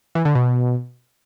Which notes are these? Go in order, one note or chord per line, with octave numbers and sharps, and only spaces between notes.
E3
D3
B2